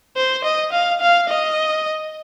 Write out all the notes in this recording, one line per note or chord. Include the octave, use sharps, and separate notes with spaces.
C5
D#5
F5
F5
D#5